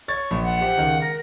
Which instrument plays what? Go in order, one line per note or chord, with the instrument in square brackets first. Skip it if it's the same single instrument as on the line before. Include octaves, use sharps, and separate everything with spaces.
[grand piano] C#5 A6 [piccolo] C#6
[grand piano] A#1
[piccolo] F#5
[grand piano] G4 C5 E5
C#2 D#3
[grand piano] A#4 [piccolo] A#6